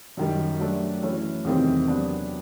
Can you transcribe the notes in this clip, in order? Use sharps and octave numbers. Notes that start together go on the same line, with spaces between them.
F#2 D#3 G3
F#3 A3 D4
E3 A3 C#4
E2 C3 D#3 G3 C4
F#3 B3 D4